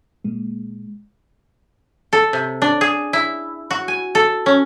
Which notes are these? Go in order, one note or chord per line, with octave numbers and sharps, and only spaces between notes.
A#2 G#3
A4
C3
D4
G#4
E4
F#4
G#5
A4
C#4